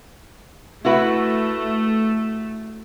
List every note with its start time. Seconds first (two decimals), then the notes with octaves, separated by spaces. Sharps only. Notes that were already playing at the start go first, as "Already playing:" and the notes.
0.85 A3 E4 F#4 B4